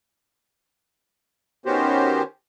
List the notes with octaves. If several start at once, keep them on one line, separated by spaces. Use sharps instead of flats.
D#3 B3 C#4 F#4 G4 C5